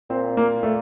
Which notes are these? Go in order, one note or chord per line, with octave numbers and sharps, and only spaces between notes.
A#2 C4
A#3
A3